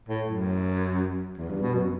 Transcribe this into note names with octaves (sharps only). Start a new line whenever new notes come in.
A2
F#2
E2
G2
B2
F#2